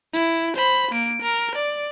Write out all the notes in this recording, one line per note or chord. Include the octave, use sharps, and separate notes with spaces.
E4
C5 B5
A#3 D7
A#4
D5